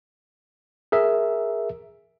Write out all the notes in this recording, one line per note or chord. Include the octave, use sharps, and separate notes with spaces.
G#4 A#4 E5